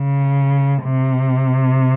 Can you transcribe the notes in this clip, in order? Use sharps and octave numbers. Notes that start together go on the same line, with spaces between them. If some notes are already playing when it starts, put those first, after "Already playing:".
Already playing: C#3
C3